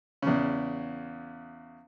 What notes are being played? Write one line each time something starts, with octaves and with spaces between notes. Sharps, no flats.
E2 C#3